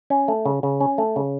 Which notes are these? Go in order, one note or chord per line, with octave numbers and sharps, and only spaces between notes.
C#4
A3
C#3
C#3
C#4
A3
C#3